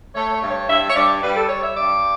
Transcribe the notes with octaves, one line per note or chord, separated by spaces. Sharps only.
A3 C#5
C#5
G2
C#5
G2 E5
C#5
G2 D5
G3 B4
A4
G3 C#5
E5
G2 D5